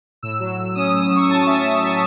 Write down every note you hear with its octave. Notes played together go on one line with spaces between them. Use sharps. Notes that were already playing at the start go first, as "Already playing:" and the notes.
A2 E6
F#3
A2
C#4 D#6
D#6
A2
D#6
F#3
C#6
A2 A5
C#4 E5
A2
F#3 E5